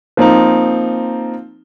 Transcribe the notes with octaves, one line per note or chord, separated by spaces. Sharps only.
F3 A#3 C4 D#4